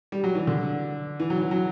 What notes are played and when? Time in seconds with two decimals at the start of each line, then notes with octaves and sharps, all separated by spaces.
0.12 G3
0.24 F#3
0.35 E3
0.47 D3
1.20 E3
1.30 F#3
1.40 E3
1.51 F#3